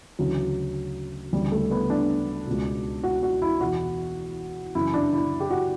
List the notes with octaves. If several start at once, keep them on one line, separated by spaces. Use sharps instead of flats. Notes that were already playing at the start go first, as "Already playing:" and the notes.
D2 C#3 E3 F#3
D2 C#3 E3 G3
A3
B3
D4
C#2 B2
F#4
F#4
E4
E2 B2 F#4
F#2 C#3 E3 E4
D4
E4
G4
F#4